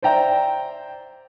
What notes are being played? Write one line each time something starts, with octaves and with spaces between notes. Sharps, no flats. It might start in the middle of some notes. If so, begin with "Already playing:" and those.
C5 D5 E5 G5 A#5